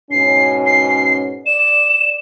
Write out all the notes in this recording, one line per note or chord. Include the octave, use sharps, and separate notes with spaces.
G#2 B2 C#4 C7
C7
D5 E7